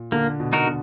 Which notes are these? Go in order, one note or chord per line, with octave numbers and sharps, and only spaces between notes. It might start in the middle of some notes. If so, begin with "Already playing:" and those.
Already playing: A#2
D3 A#3
B2
D#4 F#4 A#4
D3